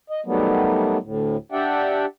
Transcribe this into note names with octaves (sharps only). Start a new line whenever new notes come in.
D#5
D#3 F#3 G3 A3 B3
D2 A2
D4 G4 D5 E5 F#5 G5